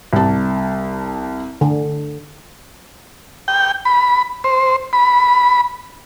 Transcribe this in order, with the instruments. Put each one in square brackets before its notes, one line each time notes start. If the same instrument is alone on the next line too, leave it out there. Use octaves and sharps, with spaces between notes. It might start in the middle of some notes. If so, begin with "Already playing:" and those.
[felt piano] C2 A5
[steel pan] D3
[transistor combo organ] G5
B5
C5
B5